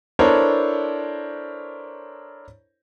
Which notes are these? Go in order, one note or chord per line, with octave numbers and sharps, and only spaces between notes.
D4 E4 A4 A#4 C5 C#5